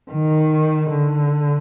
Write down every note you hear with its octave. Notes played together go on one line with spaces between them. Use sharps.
D#3
D3